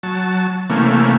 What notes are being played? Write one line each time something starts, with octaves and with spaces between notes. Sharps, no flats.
F#3 A5
C3 E3 A3 A#3 C#4